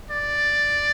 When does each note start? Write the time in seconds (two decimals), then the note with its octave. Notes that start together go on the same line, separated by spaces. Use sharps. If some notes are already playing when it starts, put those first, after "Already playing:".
0.11 D5